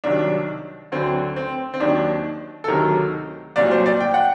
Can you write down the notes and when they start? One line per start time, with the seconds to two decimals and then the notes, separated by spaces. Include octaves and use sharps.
0.04 C2 C3 D#3 F#3 D4
0.92 D2 D3 F#3 C4
1.36 C4
1.74 C4
1.80 D#2 D#3 F#3 D4
2.64 A4
2.68 D2 C3 D#3 F#3 A#4
3.56 C2 A#2 F#3 D5
3.71 C5
3.86 D5
4.00 G5
4.14 F#5